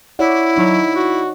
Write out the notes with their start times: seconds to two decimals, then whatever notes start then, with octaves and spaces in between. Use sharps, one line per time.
0.19 E4 C#5 D5 F#5
0.58 F#3 D#4
0.95 F#4